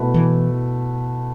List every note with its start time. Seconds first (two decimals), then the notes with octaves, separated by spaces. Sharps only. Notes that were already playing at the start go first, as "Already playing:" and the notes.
Already playing: B2 A3 E4 B4
0.14 E3